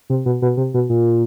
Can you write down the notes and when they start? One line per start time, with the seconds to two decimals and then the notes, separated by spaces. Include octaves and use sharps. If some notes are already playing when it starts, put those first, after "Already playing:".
0.10 C3
0.26 B2
0.42 B2
0.57 C3
0.74 B2
0.89 A#2